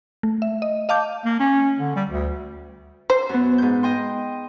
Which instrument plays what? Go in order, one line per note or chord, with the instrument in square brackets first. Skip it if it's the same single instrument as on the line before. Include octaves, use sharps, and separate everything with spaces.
[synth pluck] A3
E5
D#5
D#5 F5 A5 D6 G6
[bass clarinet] A#3
C#4
D3
G3
D2
[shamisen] C5
[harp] F#2 B3
G#2 G6
D#5 G5 C6